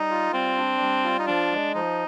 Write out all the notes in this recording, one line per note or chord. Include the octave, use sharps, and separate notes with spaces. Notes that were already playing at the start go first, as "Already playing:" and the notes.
Already playing: G3 D#4
F4
G3 C4
D4
G3
F4
D#4
F3 D4
G#3
F3 D#4